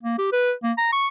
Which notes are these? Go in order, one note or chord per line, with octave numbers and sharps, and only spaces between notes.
A#3
G4
B4
A#3
A#5
C#6